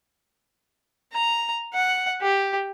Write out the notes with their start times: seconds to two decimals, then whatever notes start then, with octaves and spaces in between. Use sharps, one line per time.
1.13 A#5
1.74 F#5
2.22 G4